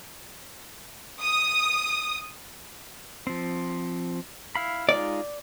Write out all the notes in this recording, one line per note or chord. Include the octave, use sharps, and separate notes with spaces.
D#6
F3 C4
E4 F5 B5
G#3 D#4 F4 D5